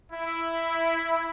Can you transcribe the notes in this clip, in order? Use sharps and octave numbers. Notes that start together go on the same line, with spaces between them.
E4